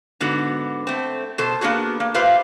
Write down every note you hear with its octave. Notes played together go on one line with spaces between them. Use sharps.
G#2 D3 B3 F#4
A3 C4
B2 A4 C5
A#3 B3 D4 F#4 G#4
A#3
F4 G4 B4 C5 E5 F5